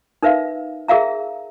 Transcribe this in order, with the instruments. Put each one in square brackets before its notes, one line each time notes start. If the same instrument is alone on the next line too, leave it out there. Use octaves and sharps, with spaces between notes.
[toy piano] D#4 A#4 B4 E5 F5
G#4 A#4 E5 F5 A#5